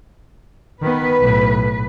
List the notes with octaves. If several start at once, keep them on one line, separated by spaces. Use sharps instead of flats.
D#3 B3 B4
B1 A2